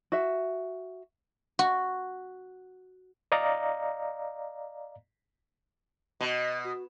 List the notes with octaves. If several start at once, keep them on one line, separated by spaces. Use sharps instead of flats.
F#4 E5
F#4
D5 D#5 F5 A#5
B2 D#5
F#4